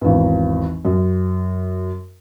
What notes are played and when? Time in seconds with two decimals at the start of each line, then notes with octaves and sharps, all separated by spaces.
0.01 G#1 E2
0.85 F#2